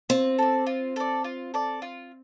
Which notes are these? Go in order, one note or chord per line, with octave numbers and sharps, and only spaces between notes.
C4 F4
A4 D5
F4
A4 D5
F4
A4 D5
F4